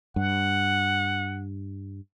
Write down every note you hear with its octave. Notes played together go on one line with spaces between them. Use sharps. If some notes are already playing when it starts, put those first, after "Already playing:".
G2 F#5